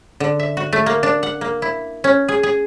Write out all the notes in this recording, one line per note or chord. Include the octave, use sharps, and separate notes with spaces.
D3
E5
F#4
A3
A#3
D4
F#5
A#3
E4
C#4
G#4
G#4